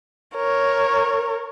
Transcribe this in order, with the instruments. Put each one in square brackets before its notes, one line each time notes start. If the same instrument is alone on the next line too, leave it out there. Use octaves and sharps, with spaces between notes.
[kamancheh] A#4 C#5